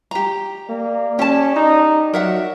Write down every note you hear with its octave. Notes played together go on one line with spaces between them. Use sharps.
G4 A#5
A#3 D5
C#4 G4 A5
D#4
F#3 A#4 E5 F#5